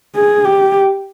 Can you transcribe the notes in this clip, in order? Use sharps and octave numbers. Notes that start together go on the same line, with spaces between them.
G#4
G4